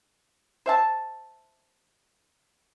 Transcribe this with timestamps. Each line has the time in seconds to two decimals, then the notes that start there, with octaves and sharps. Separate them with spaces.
0.66 C5 E5 A5